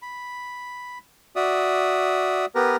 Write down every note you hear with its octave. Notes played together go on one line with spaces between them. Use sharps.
B5
F#4 D5 E5 D#6
B3 G4 A#4 B4 A#5